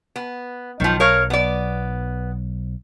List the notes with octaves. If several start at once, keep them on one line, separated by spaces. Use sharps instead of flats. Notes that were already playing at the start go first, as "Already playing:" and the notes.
B3
B1 D#3 F3 F#3
A#4 C#5 F5
B3 D5